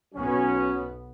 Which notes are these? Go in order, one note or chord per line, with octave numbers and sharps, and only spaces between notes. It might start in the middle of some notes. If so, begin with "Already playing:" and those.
B1 F#3 B3 C#4